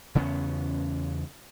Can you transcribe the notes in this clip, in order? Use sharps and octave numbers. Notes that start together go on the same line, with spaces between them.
E2 C#3 B3 C#4